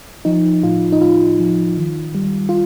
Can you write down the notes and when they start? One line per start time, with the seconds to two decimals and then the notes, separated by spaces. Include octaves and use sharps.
0.25 F3 D#4
0.63 A2 F4
0.92 D#4
1.01 A2 F4
1.39 F3
1.78 D#3
2.15 G3
2.49 F4